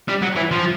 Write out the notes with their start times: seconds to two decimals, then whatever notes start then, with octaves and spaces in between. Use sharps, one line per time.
0.08 G3
0.22 F#3
0.36 E3
0.51 F3